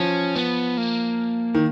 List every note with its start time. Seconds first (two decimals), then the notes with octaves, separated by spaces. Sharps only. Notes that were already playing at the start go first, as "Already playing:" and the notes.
Already playing: F3 C#4
0.36 B3
0.77 A#3
1.54 D#3